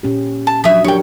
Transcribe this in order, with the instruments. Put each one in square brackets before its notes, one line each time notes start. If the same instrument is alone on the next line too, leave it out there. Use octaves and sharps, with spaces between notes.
[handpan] A#2 C#4 G4
[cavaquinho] A5
[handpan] F3 F#3 D4 [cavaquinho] E5 D#6
[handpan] D4 G4 A#4 [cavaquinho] C#5 G5